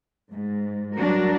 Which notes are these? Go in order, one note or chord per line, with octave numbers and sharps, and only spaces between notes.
G#2
F#3 G3 D4 F#4 A#4